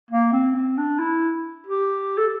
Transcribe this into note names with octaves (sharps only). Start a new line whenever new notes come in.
A#3
C4
C4
D4
E4
G4
A4